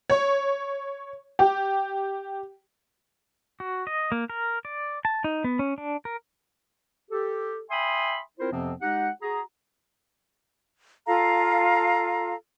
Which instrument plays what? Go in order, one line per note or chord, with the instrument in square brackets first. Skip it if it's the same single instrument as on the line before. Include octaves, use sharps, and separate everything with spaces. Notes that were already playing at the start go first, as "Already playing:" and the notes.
[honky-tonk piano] C#5
G4
[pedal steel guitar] F#4
D#5
A#3
A#4
D5
A5
D#4
B3
C#4
D4
A#4
[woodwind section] G4 A4
E5 G5 G#5 B5 C6 D#6
C4 E4 F4 A#4 C5
F2 C3 F3 B3 C4
G#3 D#4 G4 F#5
F#4 G#4 A#5
[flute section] F4 A4 F5 A#5